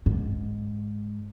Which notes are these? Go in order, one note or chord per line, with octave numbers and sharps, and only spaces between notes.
G#2